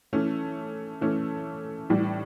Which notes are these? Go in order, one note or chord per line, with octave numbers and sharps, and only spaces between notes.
E3 A3 C#4
E3 A3 C#4
A2 E3 G3